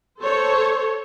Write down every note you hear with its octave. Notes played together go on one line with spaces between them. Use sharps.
A4 C5 C#5